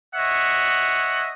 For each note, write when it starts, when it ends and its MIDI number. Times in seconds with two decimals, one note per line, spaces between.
0.15 1.31 73
0.15 1.31 75
0.15 1.31 76
0.15 1.31 78